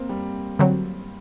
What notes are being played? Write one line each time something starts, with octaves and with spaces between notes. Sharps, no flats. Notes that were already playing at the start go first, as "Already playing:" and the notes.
Already playing: A#3 C4
G3
D3 F#3 C4